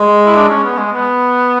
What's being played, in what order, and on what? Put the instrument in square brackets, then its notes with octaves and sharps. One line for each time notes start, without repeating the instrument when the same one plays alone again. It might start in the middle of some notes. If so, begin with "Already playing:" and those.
Already playing: [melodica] G#3
[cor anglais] E4
D4
C#4
B3
G#3
B3